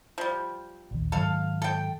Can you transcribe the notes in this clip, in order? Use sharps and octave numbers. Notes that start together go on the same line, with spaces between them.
F3 G3
A#1 D#2
G#2 D#3 F#3 A4 F5
A4 G5